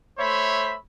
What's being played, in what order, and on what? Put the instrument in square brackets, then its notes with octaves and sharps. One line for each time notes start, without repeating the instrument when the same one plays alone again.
[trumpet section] A3 C5 C#5 E5 B5